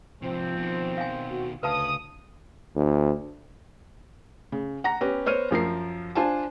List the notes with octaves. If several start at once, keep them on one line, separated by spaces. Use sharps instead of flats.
G#2 C3 F3 C4
B2 D#3
F5 G#5
F#4
D2 C#3 B4 F5 A5 D#6
D2
C#3
F#5 A#5 A#6
B3 C#4 G4
B3 C5 C#5 F6 D#7
F#2 F3 A#4 C7
D4 F4 C5 G#5 A5